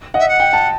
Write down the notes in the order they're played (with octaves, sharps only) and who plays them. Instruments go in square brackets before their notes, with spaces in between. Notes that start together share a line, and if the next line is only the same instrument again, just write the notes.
[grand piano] D#5 F#5
[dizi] E5
F#5
[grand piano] G5
A5